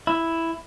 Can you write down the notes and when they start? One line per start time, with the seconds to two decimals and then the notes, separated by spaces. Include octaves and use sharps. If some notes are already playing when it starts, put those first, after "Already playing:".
0.07 E4